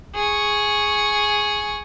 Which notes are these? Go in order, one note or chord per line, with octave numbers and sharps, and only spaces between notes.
G#4 C#6